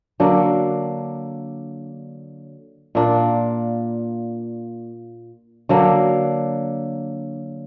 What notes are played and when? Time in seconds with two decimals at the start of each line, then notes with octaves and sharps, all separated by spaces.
0.20 D3 F#3 A#3 D4
2.95 A#2 A#3 D4
5.69 D3 F#3 A#3 D4